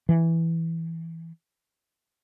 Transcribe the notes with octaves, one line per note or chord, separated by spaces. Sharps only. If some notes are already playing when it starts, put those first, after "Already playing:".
E3